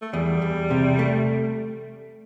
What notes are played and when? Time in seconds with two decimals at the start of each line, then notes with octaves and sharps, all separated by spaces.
0.02 A3
0.13 E2 G3
0.42 E2
0.70 C3
0.99 A3